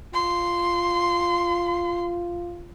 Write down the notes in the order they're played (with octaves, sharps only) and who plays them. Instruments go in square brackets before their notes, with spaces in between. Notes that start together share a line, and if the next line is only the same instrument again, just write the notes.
[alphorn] F4 [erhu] C6